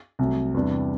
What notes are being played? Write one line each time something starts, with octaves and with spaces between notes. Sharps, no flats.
C2 C3 F#3 A3
E2 C3 G3 D4